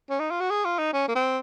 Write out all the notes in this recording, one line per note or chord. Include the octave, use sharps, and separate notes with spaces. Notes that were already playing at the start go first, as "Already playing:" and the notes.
C#4
D#4
F4
F#4
G#4
F4
D#4
C#4
A#3
C4